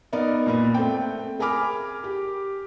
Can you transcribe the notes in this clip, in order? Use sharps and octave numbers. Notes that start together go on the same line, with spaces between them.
B3 D#4 A#4 D5 D#5
A#2 A#3 B3
A3 C4 G5
G#4 A#4 G#5 B5 D6 F6
G4